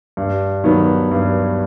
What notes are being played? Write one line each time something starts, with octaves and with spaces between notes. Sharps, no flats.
G2
D#3 F#3 B3
G2